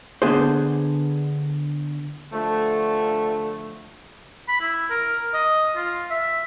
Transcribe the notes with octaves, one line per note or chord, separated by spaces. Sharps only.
D3 B3 G#4 C5
D3 F3 A3
B5
E4
A#4
D#5
F4
E5